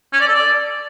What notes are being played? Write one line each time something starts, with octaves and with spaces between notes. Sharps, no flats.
C#4
D5
A4
D5